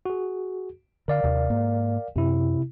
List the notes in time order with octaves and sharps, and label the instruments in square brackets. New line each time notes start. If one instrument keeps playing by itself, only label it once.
[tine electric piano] F#4 G#4
[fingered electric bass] D3 [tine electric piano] A#4 D5 F5
[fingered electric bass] D#2 C3
G#2 A#3
[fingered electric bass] F#2 [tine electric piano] C3 E4